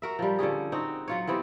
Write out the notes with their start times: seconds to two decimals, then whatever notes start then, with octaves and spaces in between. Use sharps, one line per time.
0.02 F#4 A#4 E5
0.19 F3 G3
0.39 D3 F3 C#4 G#4
0.72 C4 D#4 F#4
1.08 F#3 F4 C#5
1.28 E3 B3 C4 G4